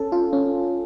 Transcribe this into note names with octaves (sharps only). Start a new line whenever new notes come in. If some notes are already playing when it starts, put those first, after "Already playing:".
Already playing: C#4 A4
F4
C#4